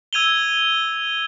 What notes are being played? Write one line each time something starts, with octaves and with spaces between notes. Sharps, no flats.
E6 G#6 D#7 F7 G7